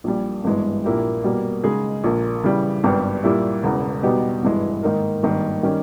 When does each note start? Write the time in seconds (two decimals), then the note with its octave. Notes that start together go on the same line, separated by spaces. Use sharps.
0.04 A#1 A#2 G3
0.44 G#1 G2 E3 G#3 B3
0.84 A#1 A#2 A#3 E4 G4
1.24 B2 G3 A#3
1.64 C#3 G#3 D#4 G#4 D#5
2.04 A#1 A#2 A#3
2.44 C#3 E3 G3
2.84 G#1 G2 G3 B3 G4
3.23 A#2 G3 A#3 E4 G4
3.63 E1 E2 C#3
4.03 B2 G3 B3 D#4 G4
4.43 G#1 G2 E3 G#3
4.83 G#2 D#3 A#3 D#4 A#4
5.23 G#1 G2 D#3 A#3
5.63 D#3 G3 C#4 G4 A#4